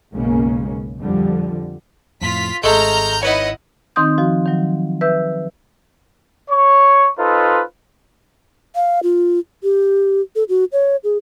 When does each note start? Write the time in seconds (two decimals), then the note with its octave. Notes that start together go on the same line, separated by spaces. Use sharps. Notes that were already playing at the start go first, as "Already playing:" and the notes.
0.13 B1 F#2 C#3 G#3 A#3 C#4
0.99 F2 D3 F3 G3
2.21 F2 A2 F4 B6
2.64 G#1 G#3 A3 A4 A#5 F6 G6
3.23 D#4 E4 B4 C#5 D#5 F#5
3.96 D#3 C4 D#4 C6 D#6 G6
4.18 F3 F#4
4.46 D#3 F#3
5.01 B4 E5 E6 G6
6.51 C#5 C#6
7.19 D#4 F4 A4 B4 C5 D#5
8.75 F5
9.03 F4
9.63 G4
10.36 A4
10.49 F#4
10.72 C#5
11.04 G#4